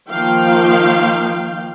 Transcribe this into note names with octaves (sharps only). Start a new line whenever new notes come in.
D#3 F3 A#3 F5 G5